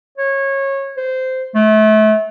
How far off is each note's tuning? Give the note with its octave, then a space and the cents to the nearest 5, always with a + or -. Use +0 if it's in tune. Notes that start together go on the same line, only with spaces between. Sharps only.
C#5 -20
C5 -15
A3 -30